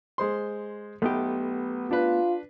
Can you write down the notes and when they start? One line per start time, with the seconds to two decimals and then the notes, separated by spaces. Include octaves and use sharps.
0.18 G#3 C5 C6
1.02 B1 A3 B3 G4
1.91 D4 F4 B4